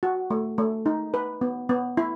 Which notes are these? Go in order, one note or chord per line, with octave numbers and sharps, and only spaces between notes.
F#4
A3
A3
D#4
B4
B3
B3
E4